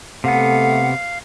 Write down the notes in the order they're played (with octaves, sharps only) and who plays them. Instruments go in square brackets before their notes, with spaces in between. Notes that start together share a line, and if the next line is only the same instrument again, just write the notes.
[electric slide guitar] C3 B3 [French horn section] A3 [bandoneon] F5 [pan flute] F#5